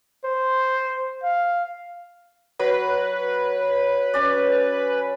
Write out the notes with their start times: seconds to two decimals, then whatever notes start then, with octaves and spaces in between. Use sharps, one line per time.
0.24 C5
1.23 F5
2.59 F#3 B4
4.14 C#4 D5